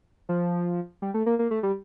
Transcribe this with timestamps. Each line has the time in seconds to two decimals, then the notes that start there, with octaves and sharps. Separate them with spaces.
0.29 F3
1.02 G3
1.14 A3
1.26 A#3
1.39 A#3
1.51 A3
1.63 G3